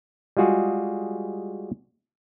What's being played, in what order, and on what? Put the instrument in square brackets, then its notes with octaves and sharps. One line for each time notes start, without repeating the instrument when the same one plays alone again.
[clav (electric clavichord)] G3 G#3 F4 F#4 G#4